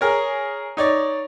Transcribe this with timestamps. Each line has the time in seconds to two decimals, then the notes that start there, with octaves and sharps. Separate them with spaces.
0.01 G#4 A#4 C#5
0.77 D#4 C#5 D5